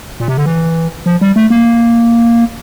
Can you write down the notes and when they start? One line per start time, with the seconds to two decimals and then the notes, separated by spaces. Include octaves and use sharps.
0.20 A#2
0.28 C3
0.37 D3
0.46 E3
1.06 F3
1.21 G3
1.36 A3
1.50 A#3